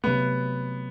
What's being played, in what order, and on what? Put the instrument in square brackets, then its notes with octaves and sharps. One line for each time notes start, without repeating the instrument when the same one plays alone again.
[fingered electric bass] C3 F#3 A3 [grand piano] B3